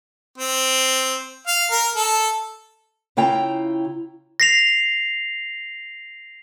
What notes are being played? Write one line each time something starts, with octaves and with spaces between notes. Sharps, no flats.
C4
F5
A#4
A4
C#3 E4 F4 G5 A#5
A#6 C7 F7